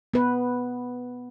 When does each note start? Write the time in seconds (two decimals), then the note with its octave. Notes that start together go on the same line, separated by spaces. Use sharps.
0.14 B3 B4